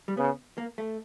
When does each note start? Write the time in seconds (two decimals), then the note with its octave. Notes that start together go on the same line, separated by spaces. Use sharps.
0.08 G3
0.17 C#3 B3
0.58 A#3
0.78 A3